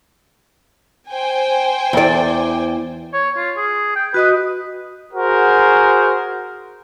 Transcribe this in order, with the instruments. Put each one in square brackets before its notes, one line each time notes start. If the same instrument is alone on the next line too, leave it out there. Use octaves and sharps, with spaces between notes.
[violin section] C5 G5 G#5
[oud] E2 D5
[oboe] C#5
F4
G#4
G5
[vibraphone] F#4 D#5 D#6 [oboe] B4
[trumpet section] F#4 G#4 A#4 C5 F#5